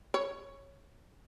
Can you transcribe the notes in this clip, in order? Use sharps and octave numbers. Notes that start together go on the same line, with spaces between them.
C#5